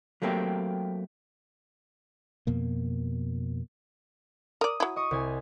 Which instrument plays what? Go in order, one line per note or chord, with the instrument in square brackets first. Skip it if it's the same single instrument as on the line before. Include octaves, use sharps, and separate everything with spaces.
[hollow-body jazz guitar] F#3 A3 A#3 C4 G4
[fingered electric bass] F2 B2 A#3
[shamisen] A#4 D5 [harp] D#6
[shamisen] F#3 E4
[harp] D#5 C#6 D#6
C2 G#5